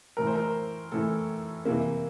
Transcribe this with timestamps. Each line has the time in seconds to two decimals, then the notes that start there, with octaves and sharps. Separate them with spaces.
0.17 A2 E3 A#4
0.27 C5
0.35 A#4
0.91 A2 E3 A4
1.65 C3 E3 A#3